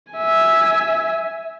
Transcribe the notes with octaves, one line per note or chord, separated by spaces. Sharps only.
E5 G#5